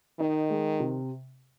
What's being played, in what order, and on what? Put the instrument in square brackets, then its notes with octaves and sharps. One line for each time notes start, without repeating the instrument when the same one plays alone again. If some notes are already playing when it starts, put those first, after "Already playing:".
[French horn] D#3 [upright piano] D#4
[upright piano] G#3
C3